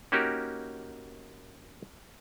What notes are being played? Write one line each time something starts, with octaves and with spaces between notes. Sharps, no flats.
A#3 C#4 D#4 F#4 G4 A#4